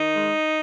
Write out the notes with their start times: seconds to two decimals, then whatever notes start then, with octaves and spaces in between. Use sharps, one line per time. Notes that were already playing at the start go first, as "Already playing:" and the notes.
Already playing: D#3 D#4
0.14 G#3